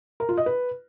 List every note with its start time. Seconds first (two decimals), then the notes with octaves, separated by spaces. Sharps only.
0.20 A#4
0.29 F4
0.37 D#5
0.46 B4